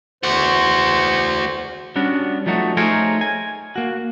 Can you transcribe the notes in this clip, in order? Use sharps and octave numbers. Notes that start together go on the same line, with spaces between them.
E2 A3 F#4 C5
G3 B3 C#4 D4 F#4
F3 F#3 A3 D#4 F#4
A3 D#4 G#4 A#4 C5 C#5
G#5
A#3 F#4